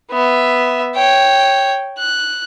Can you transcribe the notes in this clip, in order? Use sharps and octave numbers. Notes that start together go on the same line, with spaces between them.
B3 E5
C#5 G5
F#6